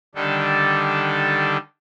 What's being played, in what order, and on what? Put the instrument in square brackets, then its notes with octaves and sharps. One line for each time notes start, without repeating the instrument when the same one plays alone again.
[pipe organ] D3 D#3 G3 D4 A4